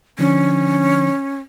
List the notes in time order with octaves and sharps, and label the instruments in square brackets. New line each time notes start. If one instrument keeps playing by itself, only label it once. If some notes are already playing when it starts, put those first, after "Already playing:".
[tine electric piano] D3 F3 D4 [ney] C#4